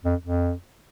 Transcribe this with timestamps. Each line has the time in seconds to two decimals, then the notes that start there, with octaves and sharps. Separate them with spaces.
0.05 F2
0.25 F2